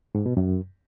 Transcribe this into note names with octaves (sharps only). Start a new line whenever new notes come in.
G#2
B2
F#2